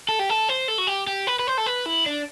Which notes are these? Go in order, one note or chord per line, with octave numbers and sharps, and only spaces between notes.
A4
G4
A4
C5
A4
F#4
G4
G4
B4
B4
C5
A4
B4
E4
D4